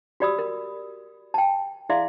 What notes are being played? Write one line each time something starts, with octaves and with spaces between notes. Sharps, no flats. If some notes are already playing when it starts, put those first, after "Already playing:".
F#4 G4 D5 B5 D#6 E6
A#4
G5 A5
E4 G#4 D5 E5 F5 C6